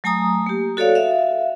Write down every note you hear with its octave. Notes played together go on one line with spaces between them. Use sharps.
F#3 A3 G#5 A#5 D#6
A#3 G4
F#4 A4 C#5 D5 F5
E5 F5